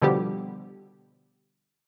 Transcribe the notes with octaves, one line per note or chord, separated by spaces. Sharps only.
B2 D3 F3 G3 B3 G4